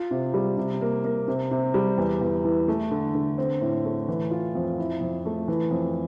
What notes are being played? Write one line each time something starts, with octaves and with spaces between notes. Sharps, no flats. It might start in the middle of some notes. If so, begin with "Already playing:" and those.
Already playing: F4
C3
G3
C3
A#3
A#3
C3
C3
G3
E2
E2
E3
A3
D3
D3
C4
A2
A3
E3
F4
F2
E4
F2
A3
E3
F2